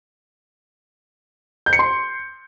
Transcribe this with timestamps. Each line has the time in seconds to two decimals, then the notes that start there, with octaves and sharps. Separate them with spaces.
1.66 G6
1.73 C#7
1.79 C6